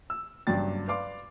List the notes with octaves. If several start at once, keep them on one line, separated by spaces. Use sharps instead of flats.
E6
F#1 G2 F#3 D4 G5 A6
B4 D5 F5 C6 D6